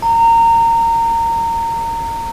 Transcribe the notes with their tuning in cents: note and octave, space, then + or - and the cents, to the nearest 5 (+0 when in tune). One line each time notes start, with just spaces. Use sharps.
A#5 -25